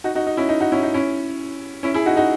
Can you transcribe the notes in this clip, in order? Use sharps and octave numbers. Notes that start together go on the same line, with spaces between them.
D#4 F#4
D#4 F#4
D#4
C#4 E4
D#4
D#4 F#4
C#4 E4
D#4
C#4 E4
C#4 E4
E4 G#4
D#4 F#4
D#4 F#4